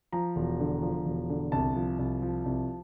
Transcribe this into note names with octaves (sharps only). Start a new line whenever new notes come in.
F3 A#5
E1
D3
F3
E1
D3
C2 A5
F3
C2
F3
C2